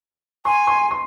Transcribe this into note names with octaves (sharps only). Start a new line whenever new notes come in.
G#5 C6
C6
C6